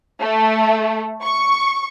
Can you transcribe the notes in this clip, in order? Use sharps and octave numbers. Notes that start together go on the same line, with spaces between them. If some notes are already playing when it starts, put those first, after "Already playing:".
A3
C#6